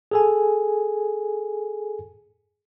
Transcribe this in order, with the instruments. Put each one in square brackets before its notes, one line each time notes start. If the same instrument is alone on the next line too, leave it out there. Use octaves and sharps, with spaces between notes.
[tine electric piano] G#4 A4 G#5